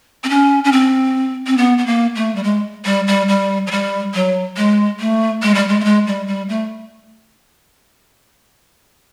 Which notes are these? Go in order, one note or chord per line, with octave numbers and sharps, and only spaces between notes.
C4
C#4
C#4
C4
C4
B3
B3
A#3
A3
G3
G#3
G3
G3
G3
F#3
G3
F#3
G#3
A3
G#3
G3
G#3
A3
G#3
G3
G3
A3